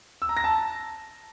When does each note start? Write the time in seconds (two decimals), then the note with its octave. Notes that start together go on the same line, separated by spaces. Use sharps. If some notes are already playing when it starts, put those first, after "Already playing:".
0.22 E6
0.29 A#5
0.37 A#6
0.44 A5